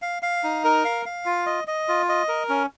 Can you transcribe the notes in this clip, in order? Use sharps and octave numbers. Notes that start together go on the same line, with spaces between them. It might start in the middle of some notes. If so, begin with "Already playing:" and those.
F5
F5
D#4
A#4
F5
F5
F4
D#5
D#5
F4
D#5
A#4
C#4